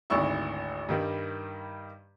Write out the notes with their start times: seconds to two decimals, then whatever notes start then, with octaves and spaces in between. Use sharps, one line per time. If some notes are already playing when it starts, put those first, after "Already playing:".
0.10 G#1 D2 E4 C#6 E6
0.89 G2 D#3 G3